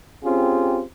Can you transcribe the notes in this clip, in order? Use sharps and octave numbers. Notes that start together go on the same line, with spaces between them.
C4 C#4 F4 G4 G#4